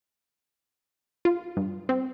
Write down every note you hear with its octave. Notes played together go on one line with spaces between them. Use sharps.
F4
G2
C4